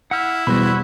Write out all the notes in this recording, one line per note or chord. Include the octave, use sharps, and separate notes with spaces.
E4 F#5 F6
E2 B2 G3 F#4 C5 B5